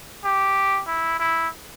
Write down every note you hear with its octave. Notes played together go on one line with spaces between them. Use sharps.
G4
E4
E4